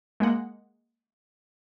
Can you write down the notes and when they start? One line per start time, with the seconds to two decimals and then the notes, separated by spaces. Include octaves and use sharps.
0.20 G#3 A#3 F#5